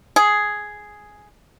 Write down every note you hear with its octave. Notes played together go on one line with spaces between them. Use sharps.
G#4